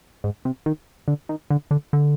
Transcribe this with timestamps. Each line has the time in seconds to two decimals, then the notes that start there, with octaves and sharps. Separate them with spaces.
0.24 G#2
0.45 C3
0.66 D#3
1.08 D3
1.29 D#3
1.50 D3
1.71 D3
1.93 D3